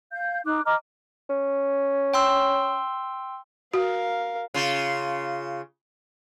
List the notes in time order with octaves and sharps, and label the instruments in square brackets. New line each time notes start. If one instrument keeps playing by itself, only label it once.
[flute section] F5 G6
D#4 D6 F#6
D#5 A#5 D6 F6
[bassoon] C#4
[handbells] G5 C6 E6
[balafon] F#4 [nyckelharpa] A#4 F5
[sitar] C#3 F4